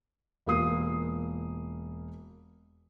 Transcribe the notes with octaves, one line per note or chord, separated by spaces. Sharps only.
E1 A#3 F4 D#6 C7